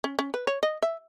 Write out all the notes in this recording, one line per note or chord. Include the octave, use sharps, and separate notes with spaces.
C#4
C#4
B4
C#5
D#5
E5